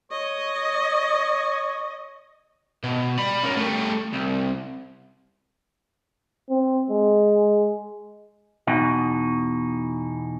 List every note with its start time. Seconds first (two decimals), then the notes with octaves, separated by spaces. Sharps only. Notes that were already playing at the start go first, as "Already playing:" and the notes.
0.11 C#5 D#5
2.84 B2
3.18 D5 B5
3.43 C#4 A#4
3.57 G3 A3
4.13 C2
6.50 C4
6.90 G#3
8.67 E2 B2 D#4